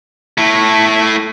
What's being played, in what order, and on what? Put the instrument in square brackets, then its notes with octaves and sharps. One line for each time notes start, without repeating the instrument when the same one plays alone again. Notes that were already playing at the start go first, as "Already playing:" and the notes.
[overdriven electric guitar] A3 E4